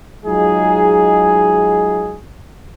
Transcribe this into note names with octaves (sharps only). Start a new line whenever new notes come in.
F#3 G#3 D#4 F4 G#4